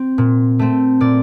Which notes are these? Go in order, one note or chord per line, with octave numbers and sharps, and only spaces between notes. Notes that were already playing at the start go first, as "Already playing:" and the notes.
Already playing: C4
A#2
A3 C4
A#2 D5